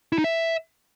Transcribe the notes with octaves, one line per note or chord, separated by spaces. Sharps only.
E4
D#4
E5